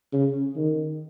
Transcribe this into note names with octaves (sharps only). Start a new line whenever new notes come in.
C#3
D#3